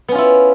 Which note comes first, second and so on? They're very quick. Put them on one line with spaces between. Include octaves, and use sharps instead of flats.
B3 C#4 F4 E4